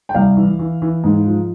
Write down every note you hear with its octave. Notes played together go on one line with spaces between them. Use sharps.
G5
C2 F5
E3
E3
E3
G#2
F3